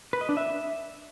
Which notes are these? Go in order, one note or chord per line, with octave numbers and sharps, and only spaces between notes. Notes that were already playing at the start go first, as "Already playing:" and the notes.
B4
D#5
D4
E5